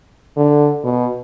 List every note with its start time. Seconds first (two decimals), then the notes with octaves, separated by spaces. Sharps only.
0.37 D3
0.84 B2